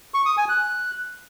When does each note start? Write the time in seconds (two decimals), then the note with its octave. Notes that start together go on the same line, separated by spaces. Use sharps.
0.14 C#6
0.26 D#6
0.37 G#5
0.49 F#6